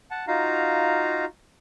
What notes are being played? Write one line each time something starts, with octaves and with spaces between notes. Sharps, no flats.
F#5 A5
D#4 F4 F#4 F5 A#5